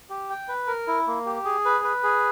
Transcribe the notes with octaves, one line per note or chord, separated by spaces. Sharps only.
G4
G5
B4
A#4
E4
A#3
G4
G#4
B4
B4
G#4